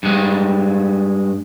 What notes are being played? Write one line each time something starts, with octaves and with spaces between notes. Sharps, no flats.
G2 G#3